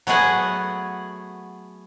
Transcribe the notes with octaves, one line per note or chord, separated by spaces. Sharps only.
F#3 A3 B3 G#4 F#5